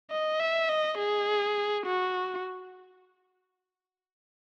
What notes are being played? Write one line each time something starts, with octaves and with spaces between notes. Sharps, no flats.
D#5
E5
D#5
G#4
F#4